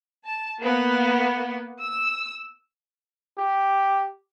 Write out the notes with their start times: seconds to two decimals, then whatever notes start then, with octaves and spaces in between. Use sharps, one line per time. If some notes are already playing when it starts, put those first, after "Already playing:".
0.25 A5
0.60 A#3 B3
1.80 E6
3.38 G4